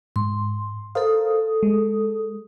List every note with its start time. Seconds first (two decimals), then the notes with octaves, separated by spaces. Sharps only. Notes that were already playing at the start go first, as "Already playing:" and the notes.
0.16 G#2 C6
0.95 A4 A#4 C5 F5 D#6
1.63 G#3